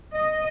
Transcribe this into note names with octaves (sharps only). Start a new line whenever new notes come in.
D#5